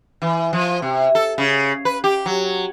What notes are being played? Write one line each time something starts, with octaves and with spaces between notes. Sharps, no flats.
E3
F3
C3
A4
C#3
B4
G4
F#3